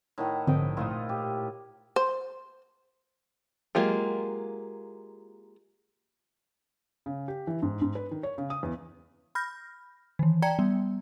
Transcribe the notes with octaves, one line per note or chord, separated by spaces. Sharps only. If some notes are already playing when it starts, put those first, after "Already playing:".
A2 D#3 F#5
A#1 G#2 D3 C4 D#5 G5
A#2 A3 E4 F4 D#5 D#7
G4
C5
F#3 G#3 A#3 F4 G4
C#3
G4
E3
G#2
G#2
B4
D#3
C#5
C#3
D#6
E2
B5 F6 G6 A#6
D#3 E3
D5 G5 A5 A#5 G#6 C#7
G3 B3